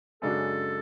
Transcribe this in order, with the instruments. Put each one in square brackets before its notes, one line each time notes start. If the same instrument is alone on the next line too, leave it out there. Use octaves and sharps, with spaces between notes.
[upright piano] F#2 C#3 G#3 D4 F#4 [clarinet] A4